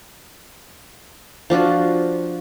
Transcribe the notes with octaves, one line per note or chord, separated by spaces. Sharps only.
F3 D4 F4 F#4